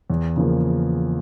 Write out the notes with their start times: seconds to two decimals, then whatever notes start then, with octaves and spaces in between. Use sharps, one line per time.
0.10 E2
0.36 C#3 F3 A#3